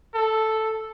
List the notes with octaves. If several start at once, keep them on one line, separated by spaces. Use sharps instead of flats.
A4